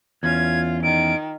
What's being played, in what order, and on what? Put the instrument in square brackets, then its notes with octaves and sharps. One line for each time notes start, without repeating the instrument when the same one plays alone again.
[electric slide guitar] E2 C#4 [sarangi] F4 [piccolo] G#6
[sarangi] D#3 [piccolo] D7